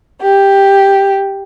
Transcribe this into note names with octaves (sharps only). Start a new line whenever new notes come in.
G4